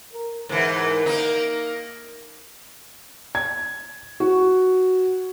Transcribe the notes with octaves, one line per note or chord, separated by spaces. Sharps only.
A#4
G#2 E3 A#4
A#3 D#4
G#6
F#4